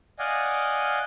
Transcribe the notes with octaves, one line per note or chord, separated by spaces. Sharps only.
D5 D#5 F5 F#5 G#5